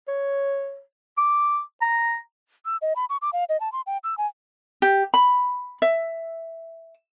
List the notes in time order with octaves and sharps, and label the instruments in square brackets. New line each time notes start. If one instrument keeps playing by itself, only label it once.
[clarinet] C#5
D6
A#5
[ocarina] E6
D#5
B5
C#6
D6
F5
D#5
A5
C6
G5
E6
G#5
[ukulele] G4
B5
E5